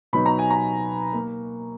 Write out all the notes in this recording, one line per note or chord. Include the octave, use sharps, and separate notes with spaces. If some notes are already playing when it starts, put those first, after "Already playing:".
B2 F#3 B3 D#4 B5
A#5
G#5
A#5
A#3